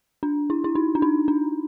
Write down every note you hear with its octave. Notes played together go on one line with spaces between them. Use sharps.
D4
E4
E4
D#4
D4
D#4
D4